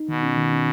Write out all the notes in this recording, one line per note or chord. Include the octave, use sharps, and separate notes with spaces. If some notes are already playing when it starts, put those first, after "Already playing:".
Already playing: D#4
B2 D#3
C#4
D#3
C#4